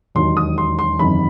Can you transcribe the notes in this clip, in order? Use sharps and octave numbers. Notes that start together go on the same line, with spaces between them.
E1 D#2 D#3 F#3 C6
D#6
C6
C6
F#1 E2 C3 D#3 B5